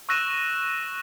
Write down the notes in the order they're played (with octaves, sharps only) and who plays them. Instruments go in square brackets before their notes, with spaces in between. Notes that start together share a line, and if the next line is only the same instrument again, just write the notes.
[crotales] C#6 E6 F#6 A#6 D#7 E7